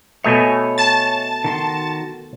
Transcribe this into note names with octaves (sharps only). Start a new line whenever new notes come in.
B2 A3 C#5 D#5 G#5
A5 A6
D#3 F#4 C6